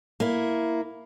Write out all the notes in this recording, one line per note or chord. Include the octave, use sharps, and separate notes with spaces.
A#3 E4